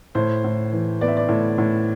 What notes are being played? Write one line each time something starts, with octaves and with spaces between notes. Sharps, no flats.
A2 C5
A2
E3
B3 D5
E5
D5
A2
A2